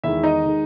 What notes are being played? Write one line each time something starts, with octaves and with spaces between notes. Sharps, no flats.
E2 D#3 G#3 E4 E5
D#4 D#5
D#3 G#3